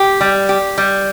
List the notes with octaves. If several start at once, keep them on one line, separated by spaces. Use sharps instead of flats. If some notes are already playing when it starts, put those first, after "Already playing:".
Already playing: G4
G3
G4
G3